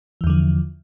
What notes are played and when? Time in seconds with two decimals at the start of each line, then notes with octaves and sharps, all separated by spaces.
0.21 E3
0.24 E2
0.27 D3
0.30 F3